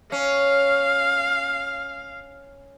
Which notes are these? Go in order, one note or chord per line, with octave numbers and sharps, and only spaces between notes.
C#4 F5